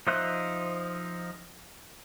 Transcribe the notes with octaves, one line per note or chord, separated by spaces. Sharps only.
F3 D#4 C5 E5 F#6